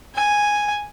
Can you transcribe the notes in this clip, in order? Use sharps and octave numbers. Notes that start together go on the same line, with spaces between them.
G#5